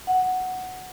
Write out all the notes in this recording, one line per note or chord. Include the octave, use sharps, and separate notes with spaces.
F#5